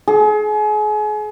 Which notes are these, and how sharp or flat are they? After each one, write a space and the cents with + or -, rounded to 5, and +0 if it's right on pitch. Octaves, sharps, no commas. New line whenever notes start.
G#4 +35